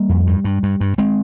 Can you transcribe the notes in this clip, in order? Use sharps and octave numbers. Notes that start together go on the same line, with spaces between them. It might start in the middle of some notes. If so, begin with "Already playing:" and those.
Already playing: G3 A#3
F2
G2
G2
G2
G2
G#3 C4